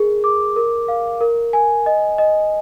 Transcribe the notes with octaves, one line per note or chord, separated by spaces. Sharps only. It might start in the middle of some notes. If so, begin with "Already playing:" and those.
Already playing: G#4 A#4
D6
A#4
F5
A#4
G#5
D#5
D#5